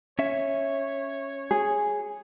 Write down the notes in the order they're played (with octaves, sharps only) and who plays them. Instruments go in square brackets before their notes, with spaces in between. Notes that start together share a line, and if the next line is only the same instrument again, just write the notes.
[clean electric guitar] C#4 E5 [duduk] C#5
[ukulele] G#4